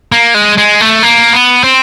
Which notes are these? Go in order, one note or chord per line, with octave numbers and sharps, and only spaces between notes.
A#3
G#3
G#3
A3
A#3
B3
C4